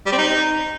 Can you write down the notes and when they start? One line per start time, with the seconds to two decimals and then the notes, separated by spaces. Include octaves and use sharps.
0.06 G3
0.12 C4
0.18 D#4